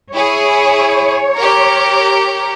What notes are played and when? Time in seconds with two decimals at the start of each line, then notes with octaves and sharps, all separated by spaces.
0.14 E4 G#4 C#5
1.36 G4 A#4